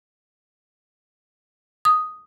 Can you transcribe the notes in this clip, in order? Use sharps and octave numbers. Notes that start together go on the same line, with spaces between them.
D#6